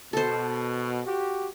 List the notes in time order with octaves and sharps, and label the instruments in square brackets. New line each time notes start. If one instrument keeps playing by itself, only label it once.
[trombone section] B2 [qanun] A4 C5
[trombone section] F#4 G4